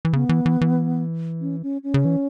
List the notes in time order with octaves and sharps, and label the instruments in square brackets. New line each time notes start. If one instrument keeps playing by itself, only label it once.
[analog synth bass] E3
[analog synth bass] C#3 [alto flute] B3
[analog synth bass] E3
E3
E3
[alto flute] C#4
C#4
C#4
[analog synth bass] C#3
E3